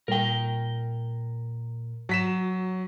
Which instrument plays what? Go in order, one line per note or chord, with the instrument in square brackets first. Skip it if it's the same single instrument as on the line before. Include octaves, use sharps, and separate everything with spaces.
[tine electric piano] A#2 [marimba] G3 [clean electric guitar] A#4 G5
[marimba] G#2 [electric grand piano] F#3 B6 E7